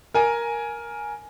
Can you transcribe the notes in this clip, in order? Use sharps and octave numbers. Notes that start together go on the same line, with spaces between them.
A#4 G#5